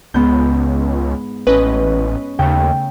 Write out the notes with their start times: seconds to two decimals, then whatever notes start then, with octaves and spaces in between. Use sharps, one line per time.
0.14 C#2 G#2 B3 G6
1.47 A1 C#4 B4 D#5
2.39 D#2 C#3 A3 G5